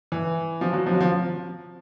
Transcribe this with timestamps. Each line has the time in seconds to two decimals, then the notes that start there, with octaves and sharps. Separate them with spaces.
0.12 E3
0.61 F3
0.73 F#3
0.86 F3
0.93 F#3
1.00 F3